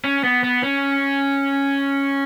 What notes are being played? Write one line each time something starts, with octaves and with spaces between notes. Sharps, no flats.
C#4
B3
B3
C#4